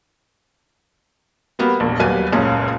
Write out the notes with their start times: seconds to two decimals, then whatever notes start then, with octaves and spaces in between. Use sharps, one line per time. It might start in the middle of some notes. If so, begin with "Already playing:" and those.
1.59 G3 A#3 B3 F#4
1.80 E1 A#1
2.00 D#2 F#3 G3 B4 G#5 D#7
2.32 F#1 C#2 A#2 C#4 G#4